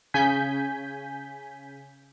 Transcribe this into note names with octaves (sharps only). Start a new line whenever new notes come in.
C#3 G#5 G6 B6